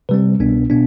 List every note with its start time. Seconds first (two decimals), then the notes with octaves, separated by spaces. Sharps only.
0.09 C3 G3 C4 B4
0.40 C2 B2 B3 D4
0.70 B2 B3 D4